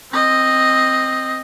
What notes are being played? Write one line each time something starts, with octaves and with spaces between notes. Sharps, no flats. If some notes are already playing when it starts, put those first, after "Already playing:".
C4 D#5